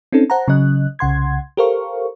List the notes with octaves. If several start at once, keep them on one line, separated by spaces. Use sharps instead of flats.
C4 C#4 D#4 A4
C5 F#5 A5 A#5
C#3 F#3 C#4 D#5 F#6
C2 C#3 F#5 C6 G#6
G4 A4 A#4 C5 F5 C#6